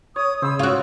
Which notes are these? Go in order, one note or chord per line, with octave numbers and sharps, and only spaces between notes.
C#5 D#6
C#3 C5 B5 D#6 E6
F4 F#4 C#5